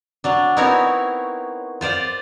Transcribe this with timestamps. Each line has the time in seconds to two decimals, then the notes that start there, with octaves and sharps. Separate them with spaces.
0.24 F#3 D4
0.57 B3 C4 D#4 E4 A#4 C#5
1.81 F4 C5 D5 F5